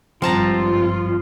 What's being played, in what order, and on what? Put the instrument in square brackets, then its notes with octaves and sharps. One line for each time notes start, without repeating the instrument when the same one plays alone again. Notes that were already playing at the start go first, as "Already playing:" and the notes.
[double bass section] G#1 G2 G3 [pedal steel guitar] F3 [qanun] C4 A5 A#5 [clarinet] F4